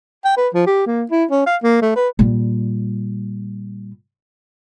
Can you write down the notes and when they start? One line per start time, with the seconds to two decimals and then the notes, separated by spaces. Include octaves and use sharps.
0.25 G5
0.37 B4
0.54 F3
0.67 G4
0.86 A#3
1.11 E4
1.30 C#4
1.46 F5
1.63 A#3
1.82 A3
1.96 B4
2.19 A#2 G3